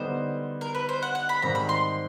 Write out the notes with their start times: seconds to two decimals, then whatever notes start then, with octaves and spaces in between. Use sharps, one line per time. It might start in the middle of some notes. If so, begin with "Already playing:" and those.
Already playing: D3 G3 B3 D#4 C5
0.61 A#4
0.75 B4
0.89 C5
1.02 F#5
1.15 F#5
1.29 B5
1.42 G#2 D#3 G3 C4 A#5
1.55 B5
1.69 C6